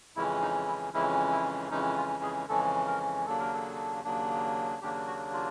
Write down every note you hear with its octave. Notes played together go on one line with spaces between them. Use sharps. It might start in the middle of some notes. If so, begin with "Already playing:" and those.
F2 C#3 E3 G#3 C#4 E4
D#4
E4
F2 C#3 E3 G#3 C#4 E4
E4
F2 C#3 E3 G#3 C#4 D#4
F4
G#4
F2 C#3 E3 G#3 C#4 A4
A#4
D#2 C#3 F#3 A#3 D4 A4
A#4
A4
D#2 C#3 F#3 A#3 D4
D#2 C#3 F#3 A#3 D4 G4
F#4
F4